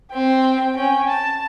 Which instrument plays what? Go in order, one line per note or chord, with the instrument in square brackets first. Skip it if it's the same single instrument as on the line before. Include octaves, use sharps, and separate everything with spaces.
[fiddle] C4 [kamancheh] G5
[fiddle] C#4 [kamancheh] G5
[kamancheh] A5